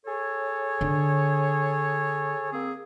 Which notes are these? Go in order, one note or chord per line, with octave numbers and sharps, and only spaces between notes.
G#4 A4 C#5
D3
A#3 C4 G#4